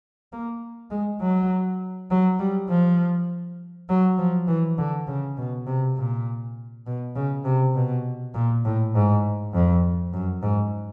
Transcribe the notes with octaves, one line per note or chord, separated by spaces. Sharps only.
A#3
G#3
F#3
F#3
G3
F3
F#3
F3
E3
D3
C#3
B2
C3
A#2
B2
C#3
C3
B2
A#2
A2
G#2
F2
F#2
G#2